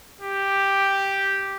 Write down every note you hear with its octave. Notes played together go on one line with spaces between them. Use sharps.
G4